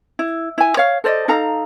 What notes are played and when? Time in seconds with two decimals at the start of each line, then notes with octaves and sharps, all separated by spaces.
0.19 E4
0.58 E4 G#5
0.77 C#5 F5
1.04 A4 C5 D5 D#5
1.28 D#4 A4 F5 A#5